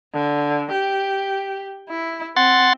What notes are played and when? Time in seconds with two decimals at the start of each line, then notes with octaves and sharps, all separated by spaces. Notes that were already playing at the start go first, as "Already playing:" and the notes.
0.14 D3
0.71 G4
1.89 E4
2.36 C4 F#5 C6 A6